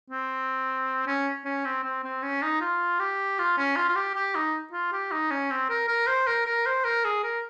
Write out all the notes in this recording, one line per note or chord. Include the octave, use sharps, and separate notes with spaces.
C4
C#4
C#4
C4
C4
C4
C#4
D#4
F4
G4
F4
C#4
F4
F4
G4
G4
D#4
F4
G4
D#4
C#4
C4
A#4
A#4
C5
A#4
A#4
C5
A#4
G#4
A#4